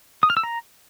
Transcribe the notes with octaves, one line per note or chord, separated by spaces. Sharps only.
D#6
F6
E6
A#5